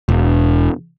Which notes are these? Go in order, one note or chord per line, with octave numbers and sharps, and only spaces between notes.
E1